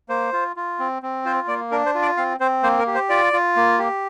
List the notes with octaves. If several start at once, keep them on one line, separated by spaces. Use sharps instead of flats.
A#3 C5
F4
F4
C4
C4
F4 C5
A#3 D5
D4 A#4
C5
F4
D5
C4 F5
C4 C5
A#3 C5
A#4
G4
C5
F4 D5
F4
A#3
G4